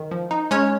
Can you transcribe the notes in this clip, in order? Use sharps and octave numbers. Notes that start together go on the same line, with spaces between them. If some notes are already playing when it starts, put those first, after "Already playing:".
Already playing: D#3
F3
D#4
G#3 C#4 C#5